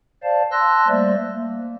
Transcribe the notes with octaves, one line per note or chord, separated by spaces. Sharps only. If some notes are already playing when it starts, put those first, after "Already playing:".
C5 D5 F5 A5
A5 C6 E6 F#6 A#6
G3 A3 A#3 C5 D5 E5
A#3